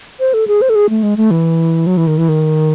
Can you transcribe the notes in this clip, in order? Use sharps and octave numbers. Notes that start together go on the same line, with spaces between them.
C5
A4
G#4
C5
A4
G#4
A3
G#3
A3
E3
F#3
E3
D#3
E3
D#3